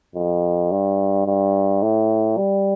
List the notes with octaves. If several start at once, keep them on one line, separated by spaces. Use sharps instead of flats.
F2
G2
G2
A2
G3